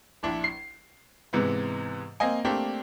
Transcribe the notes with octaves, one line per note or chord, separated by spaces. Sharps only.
A#1 D4 E4
C7
G#2 C3 E3 G#3 B3
A#3 C4 D#5 G#5
A3 A#3 C4 D4 G4 A#4